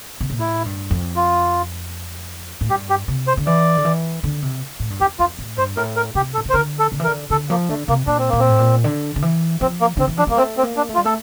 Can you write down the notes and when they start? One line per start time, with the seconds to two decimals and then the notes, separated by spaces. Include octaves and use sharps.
0.21 C3
0.30 A#2
0.39 A2 E4
0.65 G2
0.91 F2
1.16 F4
2.61 A2
2.70 G2 G4
2.89 G4
3.08 C3
3.27 C5
3.37 D3
3.46 E3 D5
3.77 D3
3.85 E3
4.24 D3
4.42 C3
4.80 A2
4.90 G2
5.00 F2 G4
5.19 F2 F4
5.39 A2
5.57 G2 C5
5.77 A2 A#4
5.96 A#4
6.15 C3 G4
6.34 A4
6.38 A#2
6.45 C3
6.50 C5
6.53 D3 A#4
6.79 A4
6.92 D3
7.00 E3
7.04 A#4
7.07 D3
7.30 D3 A4
7.50 F3 A#3
7.69 D3 A3
7.88 C3 A#3
8.07 A#2 D4
8.19 C4
8.29 A#2 A#3
8.39 C4
8.49 A2
8.59 A#2
8.84 D3
9.16 D3
9.22 E3
9.61 F3 C4
9.81 A#3
9.97 D3 C4
10.08 E3
10.17 F3 D4
10.27 G3 A#3
10.37 A3 C4
10.57 C4
10.63 A#3
10.77 D4
10.89 A3
10.95 F4
10.97 G3
11.05 A3 A4